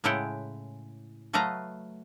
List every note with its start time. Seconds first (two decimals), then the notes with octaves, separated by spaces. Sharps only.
0.04 A2 C#3 G#3 E4 F#5 G5
1.33 F#3 A3 B4 D#5 F5 A#5